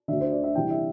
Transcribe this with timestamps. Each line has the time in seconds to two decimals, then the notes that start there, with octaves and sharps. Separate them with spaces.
0.08 D2 D3 E5
0.20 C5
0.32 D5
0.43 E5
0.55 C2 C3 E3 G5
0.70 E5